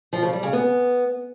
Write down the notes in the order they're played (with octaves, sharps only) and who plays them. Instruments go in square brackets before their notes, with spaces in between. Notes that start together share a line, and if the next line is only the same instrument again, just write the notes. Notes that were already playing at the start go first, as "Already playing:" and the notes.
[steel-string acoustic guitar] F3
C#3
G3
C#3
B3